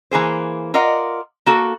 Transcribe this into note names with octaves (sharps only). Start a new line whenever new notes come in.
E3 A#3 G#4 C5
F4 A#4 D5 D#5 F#5
A#3 F#4 A4